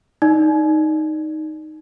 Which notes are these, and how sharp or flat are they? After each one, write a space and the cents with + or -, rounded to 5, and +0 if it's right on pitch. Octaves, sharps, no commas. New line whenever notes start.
D#4 +0 D5 +0